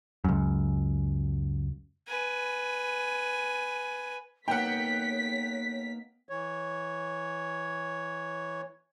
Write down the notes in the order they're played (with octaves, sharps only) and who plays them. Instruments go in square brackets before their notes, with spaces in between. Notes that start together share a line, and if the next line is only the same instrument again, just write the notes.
[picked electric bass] C#2 F#2
[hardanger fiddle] B4 G#5
[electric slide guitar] A#3 B3 D#4 [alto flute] C#5 [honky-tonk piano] F#5 G5 [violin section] B6
[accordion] E3 C#5